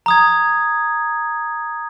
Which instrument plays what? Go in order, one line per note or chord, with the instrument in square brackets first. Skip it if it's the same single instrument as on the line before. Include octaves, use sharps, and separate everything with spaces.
[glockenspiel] A#5 D#6 G#6